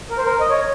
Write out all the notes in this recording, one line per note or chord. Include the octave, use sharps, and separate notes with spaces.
A#4
C5
A#4
D#5
C#5